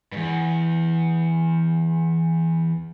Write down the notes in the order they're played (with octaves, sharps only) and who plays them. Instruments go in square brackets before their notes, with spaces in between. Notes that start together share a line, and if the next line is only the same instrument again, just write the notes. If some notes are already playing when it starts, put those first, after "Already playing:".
[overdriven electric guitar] E2 G2